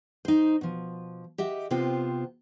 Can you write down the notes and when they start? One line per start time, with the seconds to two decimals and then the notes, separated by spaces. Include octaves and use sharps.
0.25 D#4 C5
0.61 B2 F3
1.38 G4 D#5 E5 F#5
1.71 C3 B3 C4 F4 C5